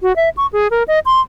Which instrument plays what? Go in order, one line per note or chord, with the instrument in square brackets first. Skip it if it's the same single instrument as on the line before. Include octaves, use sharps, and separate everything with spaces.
[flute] F#4
E5
C#6
G#4
A#4
D#5
C6